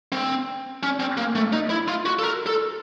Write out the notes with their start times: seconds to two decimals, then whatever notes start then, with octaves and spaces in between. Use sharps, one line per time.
0.12 C4
0.83 C#4
1.00 C4
1.17 A#3
1.35 A3
1.53 D#4
1.70 E4
1.88 F4
2.06 F#4
2.19 A4
2.23 A#4
2.47 A4